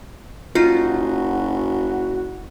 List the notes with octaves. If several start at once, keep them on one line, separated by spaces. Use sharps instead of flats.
F#1 D#4 F4 F#4